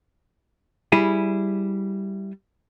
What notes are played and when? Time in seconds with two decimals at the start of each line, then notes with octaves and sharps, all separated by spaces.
0.92 G3 E4 G#4